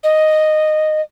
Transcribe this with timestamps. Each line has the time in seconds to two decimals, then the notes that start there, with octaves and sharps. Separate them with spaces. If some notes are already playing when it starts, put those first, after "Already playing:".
0.04 D#5